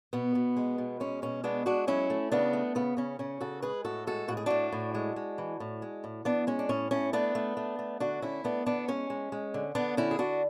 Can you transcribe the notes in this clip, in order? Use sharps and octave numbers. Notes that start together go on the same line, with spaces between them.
B2 B3
B2
G#3
B2
G#3 C#4
B2 C#4
G#3 B3 D4
G#3 D4 F#4
F#3 C#4 E4
A3
C#3 B3 D4
A3
C#3 B3
C#3 C#4
C#3 C#4
C#3 F#4 A4
G#3 G#4 B4
A2 F#4 A4
G#3 F#4 A4
A2 F#4
G#4
A2 D4 F#4
A2
G#3
G#3
E3
A2
G#3
A2
E3 B3 D4
G#3 C#4
D4
A2 C#4
A2 C#4
A3 B3 D4
A3
A3
A3
D3 D4 F#4
D3 C#4 E4
A3 B3 D4
D3 B3 D4
G#3 C#4
G#3
G#3
D3
D3 B3 D4
D3 C#4 E4
G#4
D3 D4 F#4